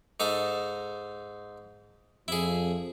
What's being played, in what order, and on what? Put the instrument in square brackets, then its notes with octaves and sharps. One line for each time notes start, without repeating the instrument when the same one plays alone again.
[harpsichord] G#2 D#4 A4
[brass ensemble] F2 F3 [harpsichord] E4 G#4